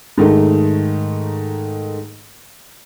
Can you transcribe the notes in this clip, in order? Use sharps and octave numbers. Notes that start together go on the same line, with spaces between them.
G#2 D#3 A3